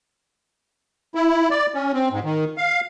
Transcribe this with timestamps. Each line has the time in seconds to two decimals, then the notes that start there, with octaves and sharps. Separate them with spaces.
1.15 E4
1.51 D5
1.74 C#4
1.94 C4
2.12 G#2
2.24 D#3
2.57 F5